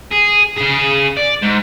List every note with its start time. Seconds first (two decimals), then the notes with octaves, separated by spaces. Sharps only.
0.12 G#4
0.58 C#3 G#4
1.17 D5
1.42 G#2